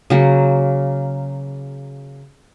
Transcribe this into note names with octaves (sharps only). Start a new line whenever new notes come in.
C#3 F#3 A#3